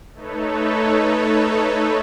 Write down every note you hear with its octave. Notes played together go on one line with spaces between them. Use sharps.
A3 D#4 A4 B4 C#5